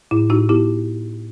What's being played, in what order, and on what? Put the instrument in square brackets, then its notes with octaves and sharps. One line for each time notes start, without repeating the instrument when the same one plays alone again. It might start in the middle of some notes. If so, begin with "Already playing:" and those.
[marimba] A2 E4
A2 D#4 F#4
B3 E4 G4